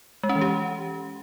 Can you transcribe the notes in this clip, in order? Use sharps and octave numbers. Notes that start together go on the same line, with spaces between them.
G#3
C#4
E3
G4